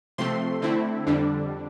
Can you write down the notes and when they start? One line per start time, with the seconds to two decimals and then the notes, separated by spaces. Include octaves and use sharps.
0.18 C3 F3 A3 C4 C6
0.62 D3 A3 C4 E4
1.07 F2 D3 G3 D4